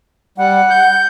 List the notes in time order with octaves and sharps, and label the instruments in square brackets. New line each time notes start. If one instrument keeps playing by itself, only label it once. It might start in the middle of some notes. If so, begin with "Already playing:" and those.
[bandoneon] G3 [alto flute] F#5
[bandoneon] G6